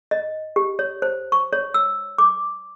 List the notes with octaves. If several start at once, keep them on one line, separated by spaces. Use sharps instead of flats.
D#5
G4
C#5
C5
C#6
C#5
E6
D6